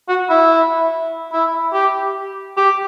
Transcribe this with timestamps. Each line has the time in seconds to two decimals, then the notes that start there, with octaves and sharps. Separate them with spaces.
0.09 F#4
0.29 E4
1.32 E4
1.73 G4
2.57 G4